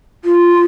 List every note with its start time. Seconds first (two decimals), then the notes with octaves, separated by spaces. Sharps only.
0.25 F4